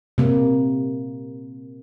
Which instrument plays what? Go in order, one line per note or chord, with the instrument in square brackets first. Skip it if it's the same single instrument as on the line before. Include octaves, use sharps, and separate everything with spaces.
[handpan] C3 A#3